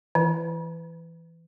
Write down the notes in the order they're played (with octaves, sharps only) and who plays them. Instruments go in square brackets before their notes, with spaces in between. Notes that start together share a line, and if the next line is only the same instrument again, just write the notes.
[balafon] E3